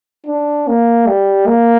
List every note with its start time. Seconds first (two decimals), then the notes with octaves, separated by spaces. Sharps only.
0.26 D4
0.67 A#3
1.07 G3
1.47 A#3